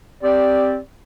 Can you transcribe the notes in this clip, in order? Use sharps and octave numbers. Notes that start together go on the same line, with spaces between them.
C4 G4 D5